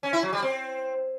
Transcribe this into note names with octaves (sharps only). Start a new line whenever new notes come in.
C#4
E4
F#3
G3
C4